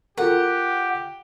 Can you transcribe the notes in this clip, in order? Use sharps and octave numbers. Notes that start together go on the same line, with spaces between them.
F4 G4 A4 A#4 F#5